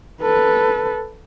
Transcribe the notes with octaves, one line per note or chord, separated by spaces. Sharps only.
A4 B4